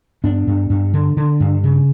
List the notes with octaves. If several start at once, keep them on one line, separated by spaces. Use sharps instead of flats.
G2 B3 D4
G2
G2
D3
D3
G2
C#3